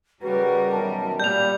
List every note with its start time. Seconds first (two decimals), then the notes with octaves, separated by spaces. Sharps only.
0.22 C#3 G3 F#4 A#4 B4
0.71 F#2 B2 D#3 A5
1.20 A#2 G3 B3 D5 G6 F7